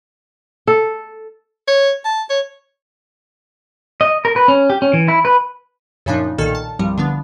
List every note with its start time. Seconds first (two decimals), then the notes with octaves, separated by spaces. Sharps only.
0.67 A4
1.68 C#5
2.05 A5
2.30 C#5
4.01 D#5
4.25 A#4
4.36 B4
4.48 C#4
4.70 G4
4.82 C#4
4.93 E3
5.08 E4
5.25 B4
6.06 F#2 A#2 C#3 F3 D4 D#4
6.38 B1 A#2 D#3 A4 F6
6.55 A5
6.79 C2 G2 F3 G3
6.98 D3 F3 B3 D4